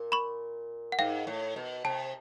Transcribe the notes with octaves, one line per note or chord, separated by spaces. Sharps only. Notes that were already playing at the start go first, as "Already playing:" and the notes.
Already playing: A#2
B5 C#6
F#5
G#2 F5 G5
A2
B2
C3 G5 A5